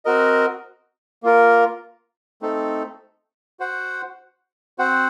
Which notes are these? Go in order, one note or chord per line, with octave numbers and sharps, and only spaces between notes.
C4 F#4 A#4 D#5
A#3 F4 A#4
A3 C4 D#4 A4
F#4 C5 F#5
C4 F#4 C5 F#5